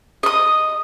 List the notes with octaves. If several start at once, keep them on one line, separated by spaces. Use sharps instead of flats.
D#5 D#6